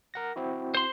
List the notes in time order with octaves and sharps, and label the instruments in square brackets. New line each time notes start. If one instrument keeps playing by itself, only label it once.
[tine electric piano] A#4 F#5 A#6
C4 E4 F#4
[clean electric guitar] C5 C6